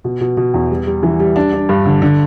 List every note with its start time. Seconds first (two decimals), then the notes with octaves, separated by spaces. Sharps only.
0.04 B2
0.21 B2
0.37 B2
0.54 E2
0.70 G3
0.87 G3
1.03 E3
1.20 G3
1.36 D4
1.53 D4
1.69 G2
1.86 D3
2.02 D3